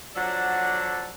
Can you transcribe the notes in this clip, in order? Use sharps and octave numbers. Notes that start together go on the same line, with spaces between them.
F3 F#3 D4 A4 D5 F#5